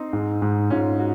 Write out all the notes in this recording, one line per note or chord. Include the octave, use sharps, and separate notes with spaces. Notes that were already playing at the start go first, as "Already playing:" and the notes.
Already playing: C4 D#4
G#2
G#2
G#2 C#4 F4
F#4